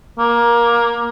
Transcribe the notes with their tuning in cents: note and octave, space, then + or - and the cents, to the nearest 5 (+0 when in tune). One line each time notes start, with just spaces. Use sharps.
A#3 +15